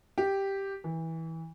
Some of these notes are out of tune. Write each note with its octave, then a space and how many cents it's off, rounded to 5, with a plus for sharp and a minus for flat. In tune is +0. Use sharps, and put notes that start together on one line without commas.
G4 +0
E3 -20